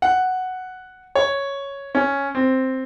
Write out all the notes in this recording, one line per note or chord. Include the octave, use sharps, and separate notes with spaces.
F#5
C#5
C#4
C4